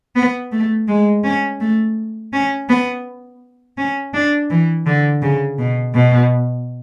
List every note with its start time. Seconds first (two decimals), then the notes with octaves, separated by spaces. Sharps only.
0.16 B3
0.52 A3
0.88 G#3
1.24 C#4
1.60 A3
2.33 C#4
2.69 B3
3.78 C#4
4.13 D4
4.50 E3
4.86 D3
5.22 C#3
5.58 B2
5.95 B2